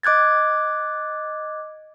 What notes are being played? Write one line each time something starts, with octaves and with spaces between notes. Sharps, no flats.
D#5 D6 F#6 G#6 A6